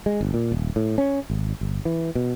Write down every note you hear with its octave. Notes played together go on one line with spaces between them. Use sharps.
G#3
G1
A#2
D#1
A2
C#4
G#1
G1
E3
B2